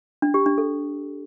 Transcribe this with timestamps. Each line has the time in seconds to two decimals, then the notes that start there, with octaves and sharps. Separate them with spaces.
0.22 D4
0.34 G4
0.46 D4
0.58 A4